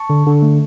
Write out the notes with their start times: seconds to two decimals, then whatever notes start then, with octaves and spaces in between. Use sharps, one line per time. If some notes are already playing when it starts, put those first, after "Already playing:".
Already playing: A5 C#6
0.10 D3
0.27 D3
0.42 A3